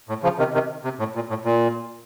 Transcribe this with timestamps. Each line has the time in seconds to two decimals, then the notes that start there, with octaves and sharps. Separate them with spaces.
0.09 A2
0.23 C#3 F3
0.39 C3 D#3
0.54 C3 D#3
0.84 C3
0.99 A2
1.15 A#2
1.29 A2
1.45 A#2